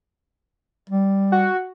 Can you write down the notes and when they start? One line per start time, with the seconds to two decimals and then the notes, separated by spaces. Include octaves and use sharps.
0.90 G3
1.32 F#4